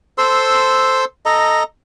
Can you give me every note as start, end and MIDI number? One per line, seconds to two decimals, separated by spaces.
0.18 1.05 69
0.18 1.05 72
0.18 1.05 84
0.18 1.05 88
1.26 1.63 69
1.26 1.63 75
1.26 1.63 82